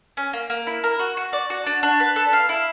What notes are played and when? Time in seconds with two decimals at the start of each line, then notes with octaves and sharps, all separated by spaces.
0.17 C#4
0.33 A#3
0.50 A#3
0.67 E4
0.84 A#4
0.99 F#4
1.17 F#4
1.33 D5
1.50 F#4
1.66 D4
1.83 D4
2.00 B4
2.16 A4
2.33 F5
2.49 E4